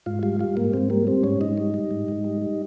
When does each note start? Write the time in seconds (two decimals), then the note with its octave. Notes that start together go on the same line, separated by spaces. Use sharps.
0.06 G#2 F4
0.23 G3 F4
0.39 G3 F4
0.57 G#2 A#3
0.73 G#2 C4
0.90 G3 A#3
1.07 G3 C4
1.23 G#2 C#4
1.41 G#2 D#4
1.58 G3
1.74 G3
1.91 G#2
2.08 G#2
2.24 G3
2.42 G3